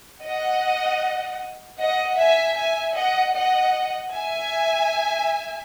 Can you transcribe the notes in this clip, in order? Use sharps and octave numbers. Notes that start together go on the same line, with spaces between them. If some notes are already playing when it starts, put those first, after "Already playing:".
D#5 F#5
D#5 F#5
E5 G#5
E5 G#5
D#5 F#5
D#5 F#5
E5 G#5